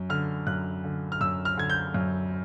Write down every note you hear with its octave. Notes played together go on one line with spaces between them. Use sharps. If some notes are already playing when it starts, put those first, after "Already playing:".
Already playing: F#2
D3 F6
F#2 F#6
D3
F6
F#2 E6
F6
D3 G#6
G6
F#2